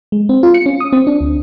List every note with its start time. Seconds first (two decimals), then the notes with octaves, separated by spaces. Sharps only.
0.12 G#3
0.29 C4
0.43 F4
0.54 C#7
0.66 C#4
0.80 D#6
0.93 C4
1.07 D4
1.21 D2